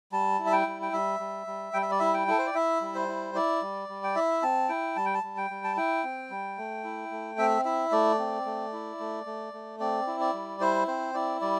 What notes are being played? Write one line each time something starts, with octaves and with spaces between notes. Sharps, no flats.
G3 A5
E4
E5
G5
G3
G5
G3 E5
G3
G3
G3 G5
E5
D5
E4 E5
G5
E4 A4
C5
D5
E4 E5
G3
C5
E4
E4 D5
G3
G3
G5
E4 E5
C4 A5
E4 G5
G3 A5
G5
A5
G3
G5
G3
A5
E4 G5
C4
G3
A3
E4
A3
C4 E5
E4 E5
A3 D5
C4
A3
E4
A3
A3
A3
C4 D5
E4
D5
G3
E4 C5
C4 C5
E4 D5
G3 D5